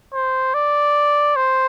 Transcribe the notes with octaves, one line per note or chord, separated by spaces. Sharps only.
C5
D5
C5